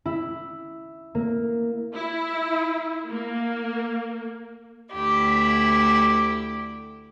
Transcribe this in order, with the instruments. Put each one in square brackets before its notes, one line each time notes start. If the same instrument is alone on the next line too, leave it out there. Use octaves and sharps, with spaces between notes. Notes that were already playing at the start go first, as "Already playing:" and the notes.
[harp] E4
A#3
[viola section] E4
A#3
[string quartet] D2 E4 G4